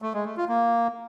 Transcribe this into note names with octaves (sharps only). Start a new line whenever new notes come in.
A3
G#3
A3
F4
A#3